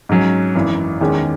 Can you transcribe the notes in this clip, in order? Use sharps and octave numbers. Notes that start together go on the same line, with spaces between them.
G#2 F#3 C#4
G#1 F#2 E3
E2 D#3 G#3 C#4